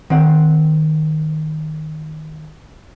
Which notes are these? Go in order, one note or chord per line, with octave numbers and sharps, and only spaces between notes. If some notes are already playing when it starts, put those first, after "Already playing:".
D#3 C4 F#5